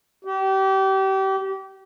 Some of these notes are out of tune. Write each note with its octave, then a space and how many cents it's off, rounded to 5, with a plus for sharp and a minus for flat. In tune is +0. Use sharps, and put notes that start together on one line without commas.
G4 -30